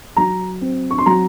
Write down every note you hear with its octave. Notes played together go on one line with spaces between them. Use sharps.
F#3 A#5
C4
C#6
C6
F#3 A#5